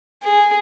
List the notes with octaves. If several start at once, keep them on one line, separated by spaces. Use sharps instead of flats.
G#4